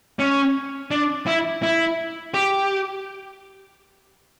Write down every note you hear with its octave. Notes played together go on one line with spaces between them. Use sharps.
C#4
D4
E4
E4
G4